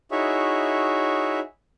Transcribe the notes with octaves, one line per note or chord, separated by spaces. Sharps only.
D#4 E4 F#4 G#4 C#5 E5